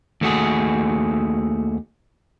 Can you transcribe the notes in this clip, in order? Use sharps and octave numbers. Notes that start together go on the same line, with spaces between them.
D#2 A3 F#4 G#4